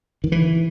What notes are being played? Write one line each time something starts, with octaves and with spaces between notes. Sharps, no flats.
D#3
E3